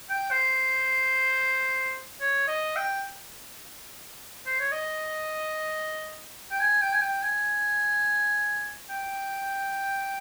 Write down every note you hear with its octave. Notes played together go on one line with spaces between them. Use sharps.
G5
C5
C#5
D#5
G5
C5
C#5
D#5
G5
G#5
G5
G#5
G5
G#5
G5